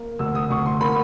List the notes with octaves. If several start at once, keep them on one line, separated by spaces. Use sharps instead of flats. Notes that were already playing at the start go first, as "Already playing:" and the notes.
Already playing: A#3
D2 E6
D#6
D2 C#6
C6
A#3 B5